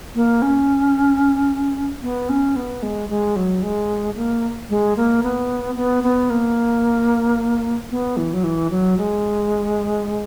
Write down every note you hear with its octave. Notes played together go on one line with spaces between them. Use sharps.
A#3
C#4
B3
C#4
B3
G#3
G#3
F#3
G#3
A#3
G#3
A#3
B3
B3
B3
A#3
B3
E3
F#3
E3
F#3
G#3